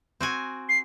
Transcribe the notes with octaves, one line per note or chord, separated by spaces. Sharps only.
C4 F#4 G#5
C7